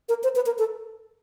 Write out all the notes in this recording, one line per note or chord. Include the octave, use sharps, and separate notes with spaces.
A#4
C5
B4
A#4
A4